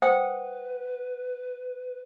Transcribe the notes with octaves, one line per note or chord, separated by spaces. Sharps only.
B4 C5 F#5 G5 D#6